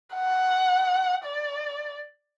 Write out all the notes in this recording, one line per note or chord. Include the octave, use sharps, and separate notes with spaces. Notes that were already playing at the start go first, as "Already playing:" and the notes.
F#5
D5